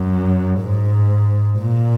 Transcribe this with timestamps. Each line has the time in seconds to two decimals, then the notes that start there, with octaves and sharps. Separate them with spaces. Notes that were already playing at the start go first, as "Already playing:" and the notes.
Already playing: F#2
0.61 G#2
1.59 A#2